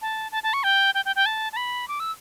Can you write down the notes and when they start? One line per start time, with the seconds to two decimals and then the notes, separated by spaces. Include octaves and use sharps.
0.02 A5
0.32 A5
0.43 A5
0.53 C#6
0.64 G5
0.95 G5
1.05 G5
1.16 G5
1.26 A5
1.53 A5
1.57 B5
1.88 D6
2.00 E6